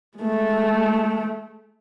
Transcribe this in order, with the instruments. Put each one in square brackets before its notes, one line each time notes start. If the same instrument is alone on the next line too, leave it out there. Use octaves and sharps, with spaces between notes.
[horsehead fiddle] G#3 A3